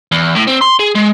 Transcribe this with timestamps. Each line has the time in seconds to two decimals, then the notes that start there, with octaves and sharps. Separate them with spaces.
0.12 E2
0.35 A2
0.48 C4
0.61 C6
0.79 G#4
0.95 G#3